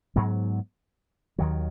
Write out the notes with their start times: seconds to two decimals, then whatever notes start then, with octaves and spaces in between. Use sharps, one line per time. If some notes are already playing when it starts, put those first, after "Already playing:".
0.16 G#2 F#3 B3
1.38 D#2 D#3 F#3